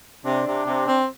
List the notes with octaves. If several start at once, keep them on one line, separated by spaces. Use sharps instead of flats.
C3 D4
C3
C3
C4